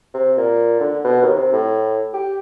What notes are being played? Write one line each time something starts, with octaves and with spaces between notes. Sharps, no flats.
C3
A#2
D3
B2
D#2
C3
A2
G4